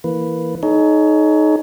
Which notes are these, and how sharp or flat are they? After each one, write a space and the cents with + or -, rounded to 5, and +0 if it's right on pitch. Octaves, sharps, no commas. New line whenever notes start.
E3 +0 A#3 +0 B4 +0
D#4 +0 G#4 +45 C#5 +25